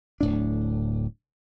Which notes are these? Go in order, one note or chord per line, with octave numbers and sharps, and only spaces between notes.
D1 A2 D4